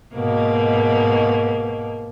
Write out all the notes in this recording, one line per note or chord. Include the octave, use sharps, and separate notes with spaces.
G#2 B2 A#3